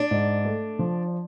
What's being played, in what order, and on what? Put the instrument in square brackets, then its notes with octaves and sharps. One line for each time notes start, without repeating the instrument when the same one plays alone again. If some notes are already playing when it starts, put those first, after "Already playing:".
Already playing: [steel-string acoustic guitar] D4
[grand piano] G#2
A3
F3